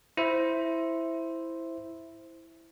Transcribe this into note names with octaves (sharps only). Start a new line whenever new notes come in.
E4 C5 E5